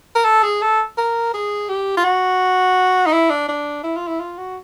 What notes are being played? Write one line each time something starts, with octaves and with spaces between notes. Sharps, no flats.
A#4
A4
G#4
A4
A#4
G#4
G4
F4
F#4
D#4
E4
D4
D4
E4
F4
E4
F4
F#4